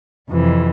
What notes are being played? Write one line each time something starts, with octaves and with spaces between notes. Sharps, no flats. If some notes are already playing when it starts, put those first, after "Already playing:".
F2 C3 E3